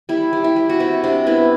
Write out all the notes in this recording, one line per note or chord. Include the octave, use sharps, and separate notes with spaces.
G3 E4
G3
E4
G3
F#4
C3 E4
C3 D4
B3 E4